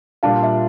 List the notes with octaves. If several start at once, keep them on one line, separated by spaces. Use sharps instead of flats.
A#2 G3 D4 F4 F5 A5
E5